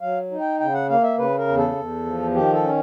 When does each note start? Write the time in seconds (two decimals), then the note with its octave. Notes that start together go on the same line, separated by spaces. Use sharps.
0.01 F#3 F5
0.31 D#4
0.40 G5
0.60 C#3 G5
0.74 F#5
0.89 A#3 F5
1.03 E5
1.18 C#3 B4
1.38 A#4
1.48 E2
1.57 A4
1.76 E2
2.06 F3
2.34 D#3 G4
2.53 A4
2.63 C#4